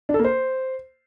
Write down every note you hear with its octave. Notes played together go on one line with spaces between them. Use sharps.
D4
A4
A#3
C5